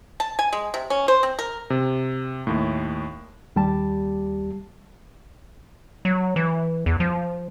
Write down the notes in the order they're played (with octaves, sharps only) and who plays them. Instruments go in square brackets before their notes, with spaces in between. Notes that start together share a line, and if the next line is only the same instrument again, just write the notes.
[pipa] A5
G#5
G#3
C3
C#4
C5
C4
A#4
[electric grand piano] C3
D#2 A2
[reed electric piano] D#2 G3 G4 A5
[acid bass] F#3
E3
E2
F3